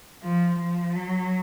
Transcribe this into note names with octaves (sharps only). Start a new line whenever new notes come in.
F3
F3
F#3